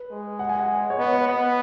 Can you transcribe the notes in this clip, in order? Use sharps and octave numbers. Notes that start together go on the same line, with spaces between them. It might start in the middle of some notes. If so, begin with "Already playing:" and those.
Already playing: B4
G#3
F#5
G#5
F#5
C#5
B3 D#5
B4
B3